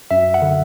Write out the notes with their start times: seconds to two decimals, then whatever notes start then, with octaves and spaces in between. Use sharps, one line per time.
0.11 F#2 E5
0.34 F#5
0.42 D3